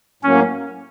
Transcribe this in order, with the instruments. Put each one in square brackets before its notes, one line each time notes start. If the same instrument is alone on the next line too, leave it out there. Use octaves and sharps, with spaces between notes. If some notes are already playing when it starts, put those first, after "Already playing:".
[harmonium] A2 F#3 A#3 [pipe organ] C#4